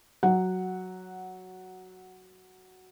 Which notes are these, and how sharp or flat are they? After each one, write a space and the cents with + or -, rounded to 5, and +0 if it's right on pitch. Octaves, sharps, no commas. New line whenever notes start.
F#3 +0 F#5 +0